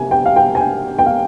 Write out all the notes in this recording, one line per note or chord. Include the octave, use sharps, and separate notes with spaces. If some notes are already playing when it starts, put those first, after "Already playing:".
Already playing: C3 G#5
G5
F5
G5
G#5
G5
G5
F5